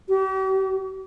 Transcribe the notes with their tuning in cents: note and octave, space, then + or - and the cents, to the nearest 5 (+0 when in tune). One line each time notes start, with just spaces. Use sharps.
G4 -45